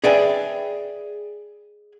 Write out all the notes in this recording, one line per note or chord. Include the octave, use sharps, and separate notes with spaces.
G#4 B4 D5 E5 G5 G#5